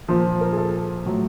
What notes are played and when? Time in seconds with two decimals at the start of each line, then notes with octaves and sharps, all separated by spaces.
0.08 A#2 F3 C5
0.41 A#4
0.52 G#4
0.57 A4
1.05 A2 F#3